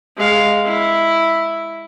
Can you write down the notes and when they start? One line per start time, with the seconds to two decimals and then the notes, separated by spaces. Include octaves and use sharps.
0.17 G#3 F5
0.65 E4